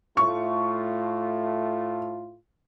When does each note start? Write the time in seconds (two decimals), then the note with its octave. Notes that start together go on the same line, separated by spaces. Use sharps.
0.17 A2 A3 F4 C#6